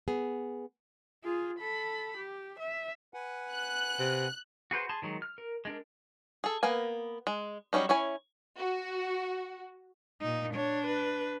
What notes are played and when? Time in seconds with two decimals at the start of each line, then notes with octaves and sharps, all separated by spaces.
0.08 B3 G#4
1.24 F4 G#4
1.59 A4 B5
2.17 G4
2.59 E5
3.14 B4 F#5 G#5
3.53 F#6
3.99 C3
4.71 F#4 G#4 B4 C5
4.89 G#4 A5 C6
5.02 D#3 F#3 G#3
5.22 F6
5.38 A#4
5.65 G#3 D4 A#4
6.44 G#4 A4
6.63 A#3 B3 A#4 G#5
7.27 G#3
7.73 F#3 G3 C#4 D#4
7.89 C#4 E4 C#5 G#5
8.56 F#4
10.21 A#2 D#4
10.54 D4 C#5
10.87 B4